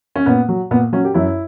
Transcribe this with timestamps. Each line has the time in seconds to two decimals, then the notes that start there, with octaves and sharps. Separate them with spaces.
0.16 C#4
0.26 A#2 B3
0.49 F#3
0.71 A#2 B3
0.92 F#3 C#4
1.04 G4
1.14 F#2 E4